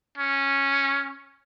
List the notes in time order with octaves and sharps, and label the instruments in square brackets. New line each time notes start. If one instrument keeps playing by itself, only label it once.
[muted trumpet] C#4